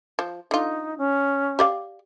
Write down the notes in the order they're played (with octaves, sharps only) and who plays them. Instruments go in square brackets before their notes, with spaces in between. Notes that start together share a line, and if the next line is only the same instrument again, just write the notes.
[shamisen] F3
[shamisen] D3 F4 [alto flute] D#4
[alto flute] C#4
[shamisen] G4 D5 F5